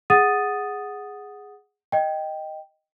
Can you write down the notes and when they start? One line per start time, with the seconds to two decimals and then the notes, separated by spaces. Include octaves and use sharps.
0.10 G#4 F#5 D#6 A6 D#7
1.92 D#5 G5